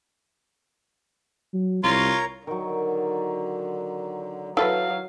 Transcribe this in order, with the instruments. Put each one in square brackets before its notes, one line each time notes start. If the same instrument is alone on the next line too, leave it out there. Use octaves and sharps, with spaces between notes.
[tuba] F#3
[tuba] C2 [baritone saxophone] F4 [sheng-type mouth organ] A#4 C#5 A#5
[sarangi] D3 [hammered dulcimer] D#3 F#3
[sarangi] F#3 [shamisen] E4 A4 B4 [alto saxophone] F5